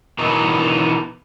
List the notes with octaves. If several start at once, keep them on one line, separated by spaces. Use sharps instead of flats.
B2 D#3 E3 D#4